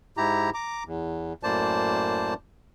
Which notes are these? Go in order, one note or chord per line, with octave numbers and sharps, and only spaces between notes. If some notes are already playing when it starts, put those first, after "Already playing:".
G#2 E4 G4 A#5
A#5 D6
E2
F#2 A2 A#3 C5 D5 A5